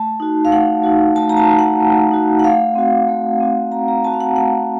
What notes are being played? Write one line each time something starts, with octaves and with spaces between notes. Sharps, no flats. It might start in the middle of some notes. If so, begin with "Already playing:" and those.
Already playing: A3 A5
D#4 F#4
F5
A3 F#5
D#4 F#4
A3 A5
A#5
A5
D#4 F#4
F#5
A3
D#4 F#4
F#5
A3 F5
C4 F#4
A3
C4 F#4
A3 A#5
A#5
C4 F#4 A5
F5
F#5
A3 F#5